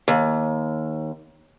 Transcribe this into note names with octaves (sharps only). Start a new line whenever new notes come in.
D#2